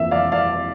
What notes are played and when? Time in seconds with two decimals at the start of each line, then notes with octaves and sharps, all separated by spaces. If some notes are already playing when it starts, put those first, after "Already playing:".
Already playing: G1 F2 E3 A#3 E5
0.11 D5 F5
0.32 D5 F5